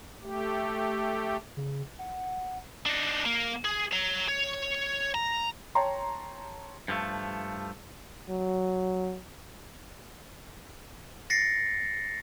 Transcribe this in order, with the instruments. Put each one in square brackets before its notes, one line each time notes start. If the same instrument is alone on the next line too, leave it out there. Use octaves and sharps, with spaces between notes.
[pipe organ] A3 G4
[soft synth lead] C#3
F#5
[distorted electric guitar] D4 D#4
A#3
G#4
C#5 A#5
C#5
A#5
[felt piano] C#5 G5 A5 A#5 C6
[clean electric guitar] G2 F3 A3
[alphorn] F#3
[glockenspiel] A6 A#6 C7 C#7